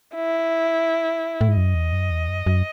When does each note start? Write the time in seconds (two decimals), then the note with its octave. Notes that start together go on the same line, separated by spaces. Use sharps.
0.15 E4
1.41 A2
1.48 G#2
1.56 F#2 D#5
1.75 E2
1.92 F#2
2.11 E2
2.29 F#2
2.46 F#2